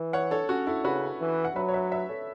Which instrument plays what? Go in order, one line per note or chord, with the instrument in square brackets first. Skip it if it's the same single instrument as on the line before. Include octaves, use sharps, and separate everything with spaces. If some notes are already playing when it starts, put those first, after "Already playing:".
Already playing: [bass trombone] E3
[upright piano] C#5 F#5
A4 C#5
C#4 F#4
E4 A4
[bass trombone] C#3 [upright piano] F#4 B4
[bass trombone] E3
[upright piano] F#5
[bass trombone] F#3 [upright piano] B4 E5
[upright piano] C#5
B4 E5
B4 E5
A4 C#5